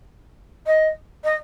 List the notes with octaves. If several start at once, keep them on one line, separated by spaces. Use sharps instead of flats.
D#5
D#5